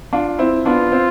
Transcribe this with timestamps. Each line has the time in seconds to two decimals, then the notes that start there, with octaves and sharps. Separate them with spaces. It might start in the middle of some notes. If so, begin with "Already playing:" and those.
0.13 D4 F4
0.39 C4 E4
0.65 B3 D4 F4
0.92 C4